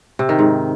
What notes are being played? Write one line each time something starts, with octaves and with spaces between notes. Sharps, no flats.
C3
D#3
G#2